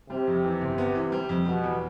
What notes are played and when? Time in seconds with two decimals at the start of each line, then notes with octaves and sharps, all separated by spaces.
0.09 C3 G3
0.27 F2
0.44 E3
0.61 G1
0.78 B3
0.95 E3
1.12 G3
1.29 F2
1.46 B2 G3
1.64 E2